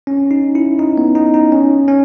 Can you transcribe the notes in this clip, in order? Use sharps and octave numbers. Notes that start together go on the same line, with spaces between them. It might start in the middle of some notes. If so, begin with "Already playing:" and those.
C#4
D#4
E4
D#4
B3
D#4
D#4
C#4
C#4